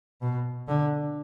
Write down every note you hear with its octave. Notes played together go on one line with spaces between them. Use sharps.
B2
D3